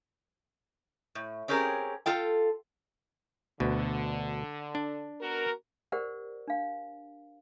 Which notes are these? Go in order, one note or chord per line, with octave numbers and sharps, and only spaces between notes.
A2
C4 C#4 G4 G#4 A#4
F4 A4 G5
D2 B2 D3
D4
B3 F#4 A#4
G4 A#4 C5 D5 F#5
D4 F5